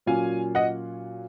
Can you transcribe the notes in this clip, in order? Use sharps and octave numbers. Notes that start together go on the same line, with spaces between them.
A#2 F#3 C#4 F4 F5 G#5
D#5 F#5